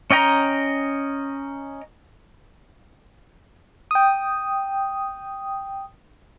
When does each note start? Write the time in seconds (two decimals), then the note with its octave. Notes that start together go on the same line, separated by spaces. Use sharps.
0.11 C#4 D#5 G5 A#5
3.91 G5 D#6